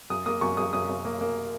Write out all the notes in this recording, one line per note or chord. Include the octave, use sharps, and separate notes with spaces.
F#2 D#6
A#3 D#6
F#2 C#6
F#2 D#6
F#2 D#6
F#2
A#3
A#3